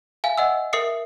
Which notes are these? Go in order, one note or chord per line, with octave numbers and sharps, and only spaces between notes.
E5 F5 G#5
D#5 F#5 E6
A#4 E5 D#6 C7 C#7